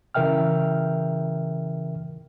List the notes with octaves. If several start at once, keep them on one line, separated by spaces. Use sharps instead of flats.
C#3 E3 A#4 E5 G5 F6